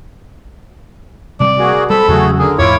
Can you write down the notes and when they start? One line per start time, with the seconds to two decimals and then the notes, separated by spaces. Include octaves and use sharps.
1.40 C3 G3 D5
1.59 A#3 F#4 G#4
1.90 G3 C4 A4 B5
2.08 E2 C#3 F#3 A3 F#4 G#4
2.39 D3 A#3 G#4
2.59 E2 G#2 E4 F4 C#5 D6